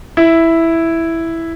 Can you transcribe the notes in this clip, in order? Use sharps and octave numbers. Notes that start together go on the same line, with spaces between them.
E4